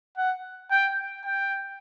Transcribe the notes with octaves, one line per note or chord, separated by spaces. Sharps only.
F#5
G5
G5